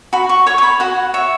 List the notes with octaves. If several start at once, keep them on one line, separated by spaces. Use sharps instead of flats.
F#4 B5
C#6
C#5 C#6
C#6
B5
F#4 F#5
C#5 E5